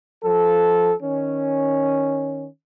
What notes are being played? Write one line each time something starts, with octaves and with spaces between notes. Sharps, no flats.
F3 A4
D#3 C#4